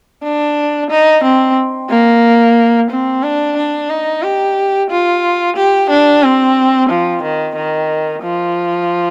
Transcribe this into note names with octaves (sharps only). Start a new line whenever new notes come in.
D4
D#4
C4
A#3
C4
D4
D4
D#4
G4
F4
G4
D4
C4
F3
D#3
D#3
F3